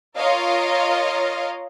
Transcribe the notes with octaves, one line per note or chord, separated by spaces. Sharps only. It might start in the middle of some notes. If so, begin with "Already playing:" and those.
F4 A#4 C#5 D#5 F5